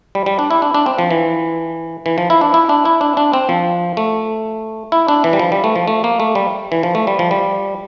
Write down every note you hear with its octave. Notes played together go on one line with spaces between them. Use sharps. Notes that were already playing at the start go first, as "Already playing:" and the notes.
G3
G3
D4
E4
D4
D4
C4
F3
E3
E3
F3
E4
D4
E4
D4
E4
D4
D4
C4
F3
A3
E4
D4
E3
G3
F3
G3
A3
F3
A3
A#3
A3
G3
E3
F3
A3
G3
F3
G3